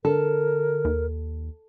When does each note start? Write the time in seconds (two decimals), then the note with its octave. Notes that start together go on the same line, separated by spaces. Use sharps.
0.05 D3 A4 A#4
0.85 D#2